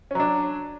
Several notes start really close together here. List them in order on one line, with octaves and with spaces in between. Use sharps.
C#4 F#3 D4